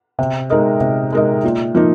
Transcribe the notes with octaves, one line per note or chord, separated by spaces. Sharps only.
C3
G#3 D#4 A#4 D#5
C3
G#3 D#4 A#4 D#5
A#2
F3 A#3 D#4